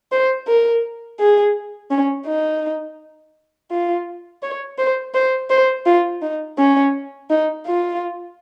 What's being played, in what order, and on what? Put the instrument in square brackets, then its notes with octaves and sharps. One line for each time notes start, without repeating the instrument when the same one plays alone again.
[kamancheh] C5
A#4
G#4
C#4
D#4
F4
C#5
C5
C5
C5
F4
D#4
C#4
D#4
F4